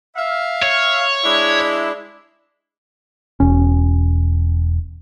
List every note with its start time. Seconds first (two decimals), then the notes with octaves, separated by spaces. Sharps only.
0.16 E5 F5
0.62 C#5
1.23 G#3 D4 E4
3.40 E1 C#4